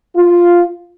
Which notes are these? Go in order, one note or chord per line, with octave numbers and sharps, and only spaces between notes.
F4